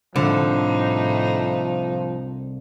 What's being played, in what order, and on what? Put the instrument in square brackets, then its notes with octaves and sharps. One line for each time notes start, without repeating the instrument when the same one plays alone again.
[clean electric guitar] C2 [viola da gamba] A2 D#4 [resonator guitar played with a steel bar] D3 [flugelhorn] F3